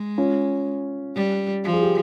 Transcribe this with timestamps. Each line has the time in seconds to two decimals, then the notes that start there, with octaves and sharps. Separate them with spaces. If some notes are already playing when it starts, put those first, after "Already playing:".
Already playing: G#3
0.18 C#4 F4
1.16 G3
1.64 F3
1.73 G#4
1.83 G4